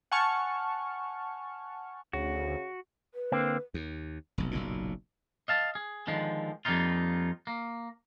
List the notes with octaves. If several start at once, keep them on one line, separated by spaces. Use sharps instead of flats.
F#5 G#5 A5 C#6 F6
D2 C#3 F#4
B4
D3 A#3 C4
D#2
F1 B1
F#1 B1 A#2
D#5 F5 A5
G#4
D3 D#3 F3 G#3
F2 G3 A#3 D#4 F4
A#3